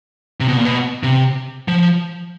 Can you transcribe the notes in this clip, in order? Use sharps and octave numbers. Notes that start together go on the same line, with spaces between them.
C3
B2
A#2
B2
C3
F3